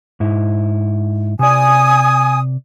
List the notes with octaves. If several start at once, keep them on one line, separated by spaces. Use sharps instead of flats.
G#2 E4
C3 D5 G#5 D#6